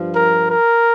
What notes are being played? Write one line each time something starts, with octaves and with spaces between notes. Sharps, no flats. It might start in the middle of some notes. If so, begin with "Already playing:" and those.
Already playing: G2 F3
A#4
A#4